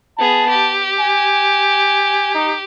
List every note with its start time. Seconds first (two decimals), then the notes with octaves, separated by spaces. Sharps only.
0.18 B3 G#4 A5
0.50 G4
1.00 G#5
2.34 D#4